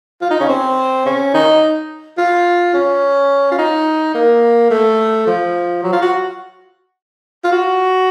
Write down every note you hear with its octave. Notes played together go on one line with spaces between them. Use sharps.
F4
D#4
C#4
C4
C#4
D#4
F4
C#4
F4
D#4
A#3
A3
F3
F#3
F4
F#4
F4
F#4